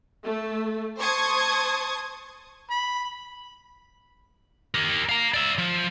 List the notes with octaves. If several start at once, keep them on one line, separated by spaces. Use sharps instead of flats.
A3
C5 A5 C6 C#6 D#6 G#6
B5
G4 A#4
F5 A#5
D5 E5
F3